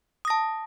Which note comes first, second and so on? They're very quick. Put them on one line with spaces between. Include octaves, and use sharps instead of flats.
D#6 A#6 A5